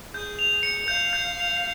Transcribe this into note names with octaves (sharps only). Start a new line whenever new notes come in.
G#4 G6
F7
C#7
F5 G6
G6
F7